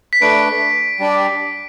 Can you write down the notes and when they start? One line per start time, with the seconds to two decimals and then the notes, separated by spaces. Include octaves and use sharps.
0.13 B6
0.21 A3 D4 B4 D7
0.99 G3 D4 G4 D5